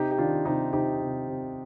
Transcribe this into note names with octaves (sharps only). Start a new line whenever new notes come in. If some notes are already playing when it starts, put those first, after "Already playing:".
Already playing: C3 D#4 G4
G4
D#3 D4 F4
C3 D#4 G4
C3 D#4 G4
C3
C3